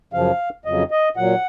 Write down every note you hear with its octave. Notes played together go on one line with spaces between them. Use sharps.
F#2 C#3 F3 F5
F2 C#3 F#3 D#5
D#5
A#2 F#3 F#5